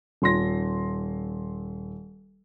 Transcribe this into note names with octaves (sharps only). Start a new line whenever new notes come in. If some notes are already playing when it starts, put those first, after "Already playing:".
D#1 C6 A#6